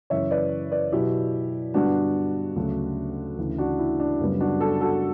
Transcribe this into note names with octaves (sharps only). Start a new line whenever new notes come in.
F#2 C#3 E3 C#5 E5
B4 D5
B4 D5
B2 F#3 B3 E4 G4
G2 D3 G3 B3 D4 F#4
D2 C#3 F#3 A3
D2 C#3 E3
D4 F#4
E4
D4
F#2 C#3 G3 B3
D4 F#4
F#4 A4
F#4 A4